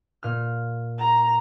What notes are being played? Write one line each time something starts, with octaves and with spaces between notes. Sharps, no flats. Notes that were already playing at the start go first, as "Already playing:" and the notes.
A#2 F6
A#5